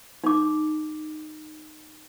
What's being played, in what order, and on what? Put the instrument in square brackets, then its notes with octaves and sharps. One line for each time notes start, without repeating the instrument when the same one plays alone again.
[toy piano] D#4 D6